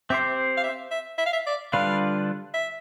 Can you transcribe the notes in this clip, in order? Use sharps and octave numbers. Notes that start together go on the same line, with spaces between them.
C4 G4 C5 E5
F5
E5
E5
E5
F5
E5
D5
D3 G3 D4 F4 B4 F5
E5